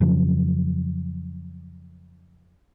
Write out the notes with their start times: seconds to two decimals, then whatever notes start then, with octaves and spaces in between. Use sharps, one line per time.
0.01 F2 C#3 F3 F#3